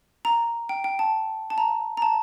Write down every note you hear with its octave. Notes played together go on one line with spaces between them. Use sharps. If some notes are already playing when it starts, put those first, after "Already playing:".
A#5
G5
G5
A5
A5
A#5
A#5
A5